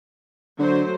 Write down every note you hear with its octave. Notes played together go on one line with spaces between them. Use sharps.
D3 F#3 A3 C5